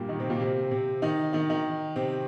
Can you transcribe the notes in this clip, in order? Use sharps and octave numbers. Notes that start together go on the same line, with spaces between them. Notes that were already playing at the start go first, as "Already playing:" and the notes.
Already playing: G2 A#2 G3 A#3
D#3 D#4
C3 C4
A#2 A#3
C3 C4
C3 C4
D#3 D#4
D#3 D#4
D#3 D#4
C3 C4